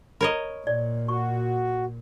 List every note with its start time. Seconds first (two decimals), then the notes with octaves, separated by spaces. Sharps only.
0.21 A#4 C#5 D#5 B5
0.67 A#2 D5
1.08 F#4 C#6